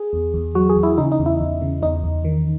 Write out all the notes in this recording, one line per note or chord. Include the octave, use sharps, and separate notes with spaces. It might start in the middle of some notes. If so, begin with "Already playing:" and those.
Already playing: G#4
E2
E2
F#3 F#4
G#4
E2
E4
C#3 D#4
D#4
E2
E4
E2
C#3
E2 D#4
E2
D#3